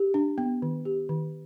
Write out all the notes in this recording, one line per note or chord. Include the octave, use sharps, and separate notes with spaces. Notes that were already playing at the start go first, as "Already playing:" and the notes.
Already playing: G4
D4
B3
D#3
G4
D#3